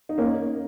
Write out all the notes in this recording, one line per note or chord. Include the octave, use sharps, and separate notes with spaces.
D#4
A#3 C#4